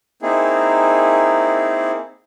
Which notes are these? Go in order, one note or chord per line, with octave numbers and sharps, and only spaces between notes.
A#3 C4 D#4 E4 G#4